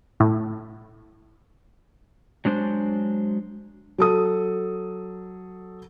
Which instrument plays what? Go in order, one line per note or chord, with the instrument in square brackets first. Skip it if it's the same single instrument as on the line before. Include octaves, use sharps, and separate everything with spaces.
[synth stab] A2
[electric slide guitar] F#3 G#3 D4 C5
[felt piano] F#3 A4 D#6